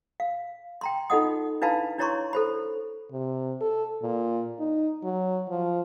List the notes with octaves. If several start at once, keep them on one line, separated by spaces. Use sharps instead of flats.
F5
G5 A#5 C6
D#4 F4 A4 D#5 F#5 D#6
D4 E4 B4 F5 A5 B5
D4 E4 C#5 A#5 C6 C#6
A4 C5 B5
C3
A4
A#2
D#4
F#3
F3